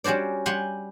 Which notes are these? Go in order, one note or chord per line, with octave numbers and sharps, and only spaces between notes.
G3 C#4 F#4 C5 D5
G3 G4 F#5 G#5 C6